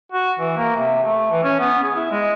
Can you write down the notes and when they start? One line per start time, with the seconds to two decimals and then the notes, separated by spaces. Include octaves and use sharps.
0.12 F#4
0.39 E3
0.57 A#3
0.76 C3
1.03 A3
1.32 E3
1.44 C#4
1.60 B3
1.84 G#4
1.96 E4
2.11 G#3